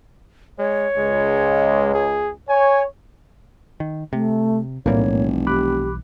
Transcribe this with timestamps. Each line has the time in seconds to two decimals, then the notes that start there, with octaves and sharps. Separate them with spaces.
0.59 G#3 C#5
0.97 C#2 G#3
1.94 G#4
2.49 C#5 G#5
3.80 D#3
4.13 C3 A3
4.86 F1 B1 A2 E3 G3 A#3 C#5
5.47 G4 B5 D6 F#6